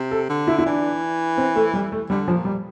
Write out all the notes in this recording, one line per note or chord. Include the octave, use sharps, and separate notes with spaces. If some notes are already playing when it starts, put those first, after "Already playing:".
Already playing: C3
A4
D3
E4
E4
E3 D4
C4
A3
G3
A3
D3 G3
F3
A#2
G3